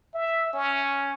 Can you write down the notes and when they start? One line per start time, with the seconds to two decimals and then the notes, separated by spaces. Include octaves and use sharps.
0.15 E5
0.53 C#4